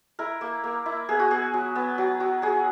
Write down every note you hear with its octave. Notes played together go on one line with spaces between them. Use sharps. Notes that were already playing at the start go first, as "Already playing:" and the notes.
E4 A#4
A#3
A#3
E4
B3 G#4
F#4
B3 G#4
F#3
B3
F#3
F#3
F#3 G#4